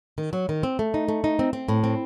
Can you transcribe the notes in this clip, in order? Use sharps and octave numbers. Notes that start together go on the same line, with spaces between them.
D#3
F#3
D#3
C4
A3
D#4
A3
D#4
C4
C4
A2
C4